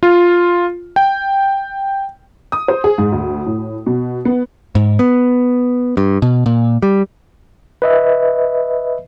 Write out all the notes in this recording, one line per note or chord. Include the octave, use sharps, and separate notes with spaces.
F4
G5
D#6
C5
G#4
G#2
D2
A2
B2
B3
G#2
B3
G2
B2
A#2
G3
B4 D#5 E5